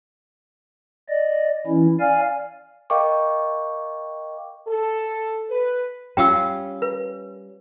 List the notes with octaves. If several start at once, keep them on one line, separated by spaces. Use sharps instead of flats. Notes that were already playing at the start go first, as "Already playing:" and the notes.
D5 D#5
E3 C#4 E4
D5 F5 G#5 F6
A#4 D#5 F5 G5 C#6 D6
A4
B4
G3 C#4 F4 G5 D#6 E6
B4